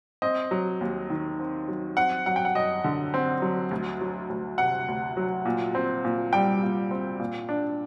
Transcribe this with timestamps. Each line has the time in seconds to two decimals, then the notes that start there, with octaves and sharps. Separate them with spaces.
0.22 C4 D#5
0.51 F#3
0.81 D#2
1.10 D#3
1.39 C4
1.68 F#3
1.97 C4 F#5
2.26 F#3 F#5
2.36 G5
2.45 F#5
2.55 F#2 D#5
2.84 D3
3.14 C4
3.42 F#3
3.71 D2
4.01 F#3
4.30 D2
4.58 C3 F#5
4.88 D2
5.17 F#3
5.45 A#2
5.75 C4
6.04 A#2
6.33 G3 G5
6.63 A#2
6.91 C4
7.20 A#2
7.49 D4